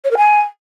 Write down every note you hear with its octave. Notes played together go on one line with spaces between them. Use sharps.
C#5
A#4
G#5